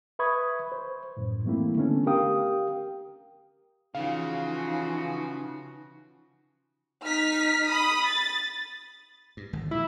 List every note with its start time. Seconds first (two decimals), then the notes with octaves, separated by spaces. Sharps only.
0.19 B4 E5 B5 C#6 D#6 G#6
0.72 C5
1.17 F#2 A2
1.45 E3 G3 A3 A#3 C4 E4
1.76 D3 A3 B3 C#4 D4
2.06 G4 A#4 F5 G5 D#6
3.95 C#3 E3 F3 D#4 F#4 F5
7.02 D#4 F6 B6
7.69 B5 D#6
8.07 A6
9.37 G2
9.53 G#1 D3 G#3
9.71 A#1 E4